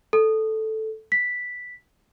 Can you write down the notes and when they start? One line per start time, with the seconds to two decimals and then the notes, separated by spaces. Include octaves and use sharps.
0.13 A4
1.12 B6